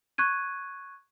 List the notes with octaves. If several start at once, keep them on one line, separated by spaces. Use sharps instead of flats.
C#6 F#6 G#6 D#7